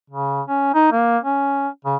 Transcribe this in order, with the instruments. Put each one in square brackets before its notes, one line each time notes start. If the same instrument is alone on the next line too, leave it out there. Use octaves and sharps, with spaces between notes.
[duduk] C#3
C#4
D#4
A#3
C#4
C#3